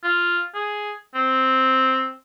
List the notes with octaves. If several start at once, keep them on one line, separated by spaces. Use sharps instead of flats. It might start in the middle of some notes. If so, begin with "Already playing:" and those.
F4
G#4
C4